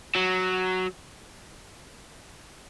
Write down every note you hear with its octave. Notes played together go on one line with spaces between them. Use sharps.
F#3